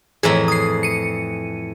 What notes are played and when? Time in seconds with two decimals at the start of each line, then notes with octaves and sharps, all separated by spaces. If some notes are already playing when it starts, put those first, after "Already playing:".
0.23 F2 A2 E3 G#4 A#5
0.48 D#6 C7
0.83 C#7 D#7